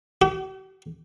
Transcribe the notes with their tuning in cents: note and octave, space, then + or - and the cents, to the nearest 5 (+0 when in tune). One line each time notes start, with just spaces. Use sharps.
G4 -45